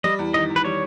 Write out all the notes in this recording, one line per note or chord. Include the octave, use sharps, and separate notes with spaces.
G3 D#5
E2
D#3 D#5
E2
B4
G3 C#5